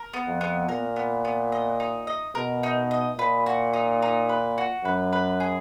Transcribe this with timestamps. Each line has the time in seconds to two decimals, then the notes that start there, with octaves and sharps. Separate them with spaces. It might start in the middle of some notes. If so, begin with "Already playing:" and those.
Already playing: A#4
0.13 B3
0.27 F2
0.41 B3
0.69 A#2 A#4
0.96 B3
1.25 B3
1.52 D#5
1.80 D#4
2.07 D#5
2.35 B2 A#4
2.63 D#4
2.91 D#5
3.18 A#2 B4
3.46 F#4
3.74 D#4
4.02 D#4
4.29 B4
4.58 F#4
4.84 F#2 B4
5.13 B4
5.40 G#4